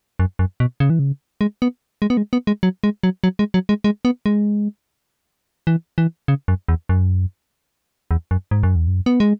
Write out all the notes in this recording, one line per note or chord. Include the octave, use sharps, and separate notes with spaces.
F#2
F#2
B2
C#3
E3
C#3
G#3
B3
G#3
B3
G#3
B3
G#3
F#3
G#3
F#3
F#3
G#3
F#3
G#3
G#3
B3
G#3
E3
E3
C#3
F#2
E2
F#2
E2
F#2
G#2
F#2
E2
F#2
B3
G#3